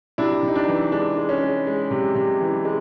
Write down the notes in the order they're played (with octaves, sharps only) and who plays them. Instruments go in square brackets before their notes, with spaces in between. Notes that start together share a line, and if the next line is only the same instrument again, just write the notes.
[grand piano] C3 D4 E4
C3 D#4
D4
E3
G#3 D4
G#3
C#4
G#3
G#3
C3
C3
E3
G#3